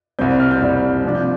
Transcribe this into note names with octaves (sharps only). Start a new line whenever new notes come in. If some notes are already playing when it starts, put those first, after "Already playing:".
C2 C3 G3 C4 G6
G6
F6
G6
C2 C3 G3 C4
C3 F3 D4
G6